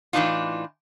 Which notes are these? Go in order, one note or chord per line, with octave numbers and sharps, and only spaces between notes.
A2 E3 F3 D4 D#4 F4